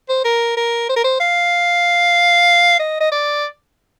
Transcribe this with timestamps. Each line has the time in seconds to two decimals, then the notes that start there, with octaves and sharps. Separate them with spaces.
0.09 C5
0.25 A#4
0.57 A#4
0.89 C5
0.96 A#4
1.04 C5
1.20 F5
2.80 D#5
3.00 D#5
3.12 D5